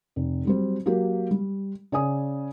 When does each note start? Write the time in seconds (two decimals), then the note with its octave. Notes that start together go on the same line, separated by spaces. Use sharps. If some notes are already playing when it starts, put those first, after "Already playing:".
0.16 F1
0.45 F#3 G3 C4
0.86 F#3 A#3 F#4 G4
1.31 G3
1.92 C#3 D5 G#5 D#6